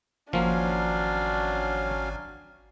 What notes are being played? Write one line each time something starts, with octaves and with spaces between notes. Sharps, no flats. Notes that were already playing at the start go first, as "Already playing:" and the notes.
G#1 F3 F#3 A#3 C#4 D4 F5